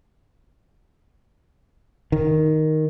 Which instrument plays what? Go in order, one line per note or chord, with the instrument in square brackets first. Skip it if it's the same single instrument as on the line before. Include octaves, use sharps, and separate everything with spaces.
[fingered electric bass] D#3